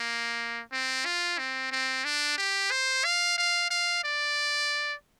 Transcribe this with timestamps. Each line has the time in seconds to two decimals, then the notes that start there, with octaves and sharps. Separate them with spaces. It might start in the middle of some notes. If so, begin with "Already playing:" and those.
Already playing: A#3
0.72 C4
1.05 F4
1.38 C4
1.71 C4
2.04 D4
2.38 G4
2.71 C5
3.04 F5
3.38 F5
3.71 F5
4.04 D5